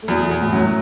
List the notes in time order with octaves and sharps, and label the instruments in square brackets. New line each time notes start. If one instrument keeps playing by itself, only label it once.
[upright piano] A3
[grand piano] E2 [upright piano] F#3
[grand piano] E2 [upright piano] B2
[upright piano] A2
[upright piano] F#2 [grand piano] F#3